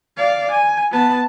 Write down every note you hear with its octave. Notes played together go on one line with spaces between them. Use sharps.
D5 F5
G#5
B3 A5